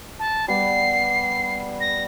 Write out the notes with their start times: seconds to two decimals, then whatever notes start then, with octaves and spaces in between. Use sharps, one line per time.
0.19 A5
0.48 G3 B3 C7
1.80 A#6